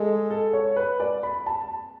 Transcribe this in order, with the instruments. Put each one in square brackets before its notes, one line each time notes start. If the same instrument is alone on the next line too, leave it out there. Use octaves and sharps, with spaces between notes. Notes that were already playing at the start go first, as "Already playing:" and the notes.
Already playing: [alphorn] G#3 [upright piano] A4
[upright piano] A4
C#5
B4
D5
B5
A5